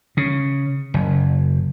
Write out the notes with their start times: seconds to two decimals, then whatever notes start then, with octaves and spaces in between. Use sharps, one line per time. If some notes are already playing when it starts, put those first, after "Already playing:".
0.17 C#3
0.94 F#1